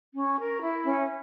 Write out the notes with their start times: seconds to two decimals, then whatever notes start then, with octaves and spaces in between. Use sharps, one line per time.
0.15 C#4
0.38 A#4
0.61 E4
0.85 C#4